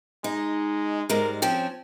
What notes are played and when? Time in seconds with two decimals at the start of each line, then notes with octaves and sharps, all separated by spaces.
0.24 G#3 D#4
1.09 G#2 G3 G#3 A#4
1.42 F3 C4 C#4 G5